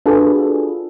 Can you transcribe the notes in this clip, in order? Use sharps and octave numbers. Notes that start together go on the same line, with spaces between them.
D4 F4 F#4 G#4 A4 B4